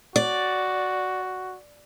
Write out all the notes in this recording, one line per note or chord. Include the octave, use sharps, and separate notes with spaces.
F#4 D5